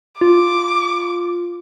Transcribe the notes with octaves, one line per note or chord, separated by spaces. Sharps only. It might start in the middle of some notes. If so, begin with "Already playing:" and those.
F4 D6